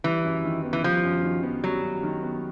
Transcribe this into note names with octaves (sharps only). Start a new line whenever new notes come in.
E3 G3
F#2
D#3
B3
E3
F3 G3
F#2
D#3
B3
F#3 G3
F#2
D#3
B3